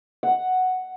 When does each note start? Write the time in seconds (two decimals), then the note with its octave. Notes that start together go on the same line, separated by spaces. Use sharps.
0.23 F#5